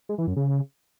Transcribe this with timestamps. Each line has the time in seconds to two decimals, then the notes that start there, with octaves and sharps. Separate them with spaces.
0.09 G#3
0.18 E3
0.27 F#2
0.36 C#3